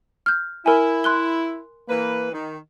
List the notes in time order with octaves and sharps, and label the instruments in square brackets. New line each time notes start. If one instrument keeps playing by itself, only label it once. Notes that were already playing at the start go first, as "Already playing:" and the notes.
[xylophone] F6 G6
[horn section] E4 [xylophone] A#4 G#5
[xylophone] C6 F#6 G7
[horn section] E3 A#3 B4
D#3